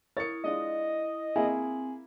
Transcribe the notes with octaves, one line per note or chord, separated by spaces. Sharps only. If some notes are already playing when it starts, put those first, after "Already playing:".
E4 A#4 C#5 D#6 A6 C#7
G#3 D4 F4 D#5
A#3 C4 E4 G#4